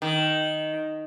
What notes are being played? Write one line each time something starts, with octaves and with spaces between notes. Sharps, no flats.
D#3